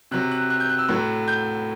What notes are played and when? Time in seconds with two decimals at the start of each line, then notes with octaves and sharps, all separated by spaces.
0.11 C3 F#3 F#6
0.31 F#6
0.50 F#6
0.60 G6
0.69 F#6
0.79 E6
0.88 A2 F#3 F#6
1.28 G6